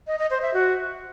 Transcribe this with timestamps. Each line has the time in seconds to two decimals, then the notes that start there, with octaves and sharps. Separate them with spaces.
0.07 D#5
0.19 D#5
0.30 C5
0.42 E5
0.54 F#4